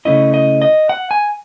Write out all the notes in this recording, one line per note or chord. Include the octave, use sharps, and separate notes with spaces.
C#3 E3 A3 C#4 E4 D#5
D#5
D#5
F#5
G#5